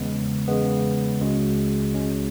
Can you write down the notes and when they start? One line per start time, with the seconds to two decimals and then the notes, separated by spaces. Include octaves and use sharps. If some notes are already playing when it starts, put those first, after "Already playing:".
Already playing: E2 C#3 G#3 B3
0.48 E2 C#3 G#3 B3
1.21 C#2 C#3 G#3 C#4 F#4
1.94 C#2 C#3 G#3 C#4 F#4